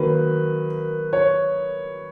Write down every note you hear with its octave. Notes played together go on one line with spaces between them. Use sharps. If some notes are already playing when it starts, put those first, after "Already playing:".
Already playing: D#3 F#3 A#3 B4
C#5